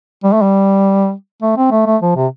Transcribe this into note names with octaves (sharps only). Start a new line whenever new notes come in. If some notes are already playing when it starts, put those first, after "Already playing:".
G3
A3
G3
A3
C4
A3
A3
F3
C3